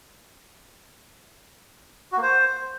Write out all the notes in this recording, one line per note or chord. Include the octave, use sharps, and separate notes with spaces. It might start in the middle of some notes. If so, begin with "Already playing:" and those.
F#4
A#3
C5